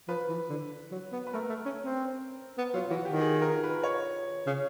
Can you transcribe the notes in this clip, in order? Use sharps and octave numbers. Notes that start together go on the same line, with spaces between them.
F3 B4
E3
D3
F#3
B3
B4
A3 A#4
A3
C#4
C4
B3
F#3 F4
E3 F#4
D#3 G4
G#4
A#4
B4
C#5
C#3